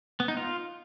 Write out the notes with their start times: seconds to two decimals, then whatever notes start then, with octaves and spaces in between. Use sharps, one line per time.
0.20 B3
0.28 D#4
0.37 F4